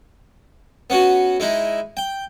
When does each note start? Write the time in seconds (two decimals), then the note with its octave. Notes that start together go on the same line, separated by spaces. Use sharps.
0.90 B3 C#4 F#4
1.40 G#3 D#4 E4
1.97 G5